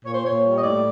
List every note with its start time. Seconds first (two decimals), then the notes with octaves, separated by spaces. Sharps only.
0.05 A#2 C#5
0.14 C5
0.25 A#2 C#5
0.44 G3
0.56 D#5
0.64 A2 D5